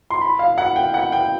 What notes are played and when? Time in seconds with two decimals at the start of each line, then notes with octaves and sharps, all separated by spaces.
0.10 C6
0.21 B5
0.39 F5
0.58 F#5
0.76 G5
0.94 F#5
1.12 G5